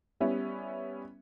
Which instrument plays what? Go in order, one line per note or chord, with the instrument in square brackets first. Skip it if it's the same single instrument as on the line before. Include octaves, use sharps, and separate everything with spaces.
[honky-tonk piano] G3 B3 C#4 E4